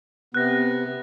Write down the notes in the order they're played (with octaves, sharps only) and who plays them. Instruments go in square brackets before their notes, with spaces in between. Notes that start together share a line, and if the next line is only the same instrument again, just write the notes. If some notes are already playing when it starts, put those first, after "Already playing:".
[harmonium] C3 B3 [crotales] F#6 A#6